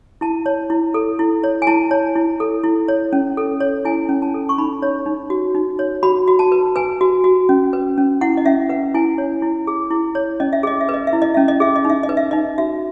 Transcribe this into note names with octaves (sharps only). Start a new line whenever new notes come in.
E4 A5
C#5
E4
A4
E4
C#5
G#5
E4 A5
C#5
E4
A4
E4
C#5
C#4
A4
C#5
E4 G#5
C#4
A5
A4
C#6
D#4 B5
C#5
D#4
F#4
D#4
C#5
F#4 B5
F#4
A5
B4
B4 G#5
F#4
F#4
C#4
B4
C#4
E4 F#5
D#5
C#4 E5
B4 F#5
E4 G#5
C#5
E4
G#4
E4
C#5
C#4 D#5
E5
G#4 D#5
E5
B4 D#5
E5
E4
D#5
C#4 E5
D#5
G#4 E5
D#5
D#4 E5
D#5
B4
E5
D#4 D#5
F#4 E5